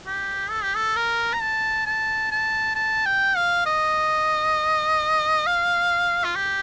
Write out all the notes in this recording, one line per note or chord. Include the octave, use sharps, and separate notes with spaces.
G4
A4
G4
A4
A#4
A#5
A5
A5
A5
A5
G5
F5
D#5
F5
F4
G4